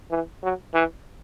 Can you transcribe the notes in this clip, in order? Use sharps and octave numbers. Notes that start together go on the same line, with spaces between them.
E3
F#3
E3